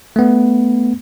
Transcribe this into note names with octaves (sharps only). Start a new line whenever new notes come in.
A3 B3